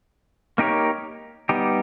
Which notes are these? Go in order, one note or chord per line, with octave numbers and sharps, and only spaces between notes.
A#3 D#4 G4 A#4 C#5
G3 B3 D#4 G4